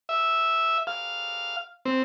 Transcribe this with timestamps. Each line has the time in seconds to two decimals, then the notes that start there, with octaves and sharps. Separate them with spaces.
0.09 E5
0.87 F5
1.85 C4